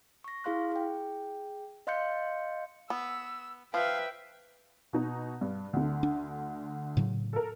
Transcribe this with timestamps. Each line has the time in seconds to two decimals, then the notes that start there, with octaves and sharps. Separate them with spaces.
0.24 C#6 A#6
0.44 E4 G#4 F5 C6 F#6
0.72 G#4 G5
1.87 D#5 F5 C6 F#6 G6 C#7
2.90 B3 E6
3.74 F3 B4 E5 F5 G5
4.93 B2 D#4
5.41 G2
5.73 D2 D3
6.03 D4
6.97 A2 C#3 F#3
7.33 A4 A#4